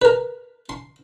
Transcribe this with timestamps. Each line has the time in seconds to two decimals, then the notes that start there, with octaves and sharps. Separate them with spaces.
0.02 A#4 B4
0.69 C6